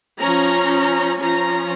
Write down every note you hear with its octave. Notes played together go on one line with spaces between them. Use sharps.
F3 C#4 A#5
F3 C#4 A#5